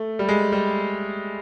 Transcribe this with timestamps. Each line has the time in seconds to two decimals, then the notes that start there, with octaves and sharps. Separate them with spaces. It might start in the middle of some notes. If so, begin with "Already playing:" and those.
Already playing: A3
0.19 G3
0.29 G#3
0.52 G3